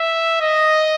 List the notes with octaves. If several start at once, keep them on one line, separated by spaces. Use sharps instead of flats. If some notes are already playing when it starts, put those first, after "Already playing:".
Already playing: E5
D#5